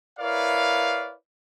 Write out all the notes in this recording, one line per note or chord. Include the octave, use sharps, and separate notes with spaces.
E4 A#4 B4 C#5 D5 F5